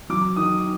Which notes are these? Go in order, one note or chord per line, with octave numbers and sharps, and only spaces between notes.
F#3 D6
D#3 D#6